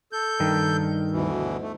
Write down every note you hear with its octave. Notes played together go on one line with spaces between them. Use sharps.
A4 G6
G2 D#3
D2 B2 E3
A3